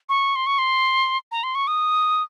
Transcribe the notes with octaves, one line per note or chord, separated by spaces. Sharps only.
C#6
C6
C#6
C6
A#5
C6
C#6
D#6